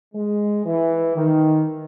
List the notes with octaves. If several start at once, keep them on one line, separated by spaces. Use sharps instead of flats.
G#3
E3
D#3